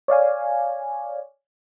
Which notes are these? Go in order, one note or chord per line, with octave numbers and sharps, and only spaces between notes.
C#5 D5 F5 G#5